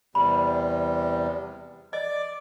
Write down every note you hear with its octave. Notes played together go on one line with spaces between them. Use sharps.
E2 C3 G3 B5
D5 D#5 D6